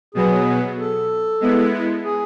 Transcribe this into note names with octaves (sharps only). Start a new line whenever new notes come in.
B2 F#3 B3 G#4
A4
G#3 B3 E4
G#4